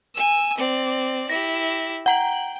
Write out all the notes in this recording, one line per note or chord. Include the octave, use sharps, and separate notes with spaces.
G#5 E6
C4 D5
E4 G4 A#6
F#5 G5 A#5 F#7